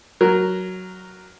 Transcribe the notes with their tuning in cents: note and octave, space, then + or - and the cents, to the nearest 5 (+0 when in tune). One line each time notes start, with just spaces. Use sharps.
F#3 +0 A#4 +0